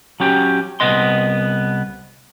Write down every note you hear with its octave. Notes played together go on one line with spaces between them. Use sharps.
F#3 C#4 G4
C2 B3 D#5 C6